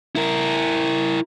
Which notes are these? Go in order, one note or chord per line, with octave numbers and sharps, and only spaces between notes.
E4 A#4